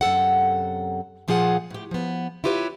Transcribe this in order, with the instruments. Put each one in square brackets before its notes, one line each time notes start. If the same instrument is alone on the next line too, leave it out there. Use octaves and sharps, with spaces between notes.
[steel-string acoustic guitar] F#2 C3 A4 F#5
A#2 F3 F4 G#4 A#4 F#5
A2 G4
F3 B3
E4 F4 G4 B4 C#5